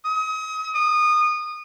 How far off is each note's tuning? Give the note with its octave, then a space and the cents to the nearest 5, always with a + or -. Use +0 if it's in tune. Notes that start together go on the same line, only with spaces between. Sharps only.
D#6 +35
D#6 -25